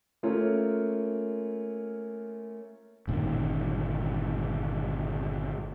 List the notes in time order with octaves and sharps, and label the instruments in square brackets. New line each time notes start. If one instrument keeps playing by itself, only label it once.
[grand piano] A3 A#3 C#4 F4 A#4
[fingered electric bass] G1 A#2 D#3